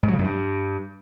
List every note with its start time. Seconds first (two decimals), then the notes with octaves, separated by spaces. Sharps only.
0.03 G#2
0.08 F#3
0.13 C#3
0.19 F#2
0.24 G2